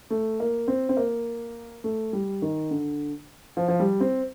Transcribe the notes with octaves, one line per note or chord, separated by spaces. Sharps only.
A3
A#3
C4
C4
A#3
A3
G3
D#3
D3
F3
F3
G3
C4